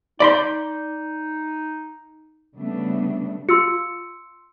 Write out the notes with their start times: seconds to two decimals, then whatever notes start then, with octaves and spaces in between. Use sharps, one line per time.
0.20 D#4 D5 B5 C6
2.55 C#3 G3 A3 B3 D4
3.49 F4 C6 E6 C#7